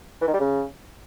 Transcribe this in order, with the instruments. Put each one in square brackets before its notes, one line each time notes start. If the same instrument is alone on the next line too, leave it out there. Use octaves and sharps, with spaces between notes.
[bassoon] E3
D#3
G3
C#3